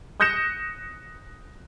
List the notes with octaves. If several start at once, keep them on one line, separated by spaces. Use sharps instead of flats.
D#6 F#6 G6 A#6 C#7 E7